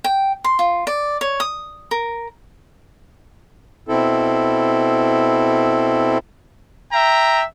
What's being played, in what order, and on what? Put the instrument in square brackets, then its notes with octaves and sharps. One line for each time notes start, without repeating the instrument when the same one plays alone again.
[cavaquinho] G5
C6
F4
D5
C#5
D#6
A#4
[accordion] B2 C4 E4 A4
[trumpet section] E5 G5 A#5